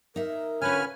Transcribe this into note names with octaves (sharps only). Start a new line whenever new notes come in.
D#4 A#4 E5
D3 C#4 F4 B4 G#5 F6